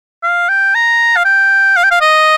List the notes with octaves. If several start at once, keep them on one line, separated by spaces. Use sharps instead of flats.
F5
G5
A#5
F5
G5
F5
G5
F5
D#5